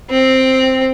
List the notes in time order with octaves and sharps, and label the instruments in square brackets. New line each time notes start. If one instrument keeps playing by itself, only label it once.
[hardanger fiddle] C4